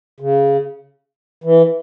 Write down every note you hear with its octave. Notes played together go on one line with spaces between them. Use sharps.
C#3
E3